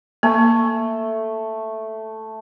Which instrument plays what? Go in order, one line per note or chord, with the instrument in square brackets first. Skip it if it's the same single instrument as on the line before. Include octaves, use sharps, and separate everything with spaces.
[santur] A3 [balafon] A#3